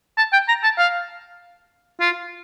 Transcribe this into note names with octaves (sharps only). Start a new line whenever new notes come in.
A5
G5
A#5
A5
F5
F4